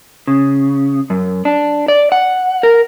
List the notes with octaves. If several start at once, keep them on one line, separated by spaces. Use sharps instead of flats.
C#3
F#2
D4
D5
F#5
A#4